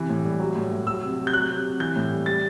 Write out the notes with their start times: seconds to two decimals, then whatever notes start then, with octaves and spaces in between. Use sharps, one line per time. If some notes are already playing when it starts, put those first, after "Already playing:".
Already playing: C3 E3
0.09 A2
0.24 G3
0.40 F#3
0.55 A2
0.71 A2
0.87 F#3 E6
1.02 C3
1.18 C3
1.27 G6
1.33 F#3 F#6
1.49 C3
1.65 C3
1.80 E3 G6
1.96 A2
2.12 G3
2.26 G3 A6